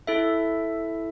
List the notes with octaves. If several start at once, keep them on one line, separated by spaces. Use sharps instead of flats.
E4 A4 E5